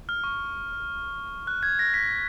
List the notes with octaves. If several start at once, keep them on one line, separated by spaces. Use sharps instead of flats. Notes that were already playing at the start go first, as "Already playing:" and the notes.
F6
C#6
F#6
G#6
A#6
B6